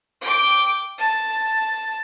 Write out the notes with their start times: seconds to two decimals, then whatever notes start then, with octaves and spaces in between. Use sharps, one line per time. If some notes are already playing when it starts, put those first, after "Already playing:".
0.21 G5 D6
0.98 A5